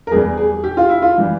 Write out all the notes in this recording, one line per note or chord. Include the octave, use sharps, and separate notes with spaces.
A#4
E2 E3 G3 G#4
G#4
G4
F4
E4
F4
E3 G3